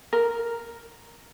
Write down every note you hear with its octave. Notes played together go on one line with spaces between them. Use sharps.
A#4